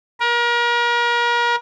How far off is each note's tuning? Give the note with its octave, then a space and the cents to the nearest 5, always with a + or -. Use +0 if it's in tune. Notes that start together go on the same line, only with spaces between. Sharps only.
A#4 +35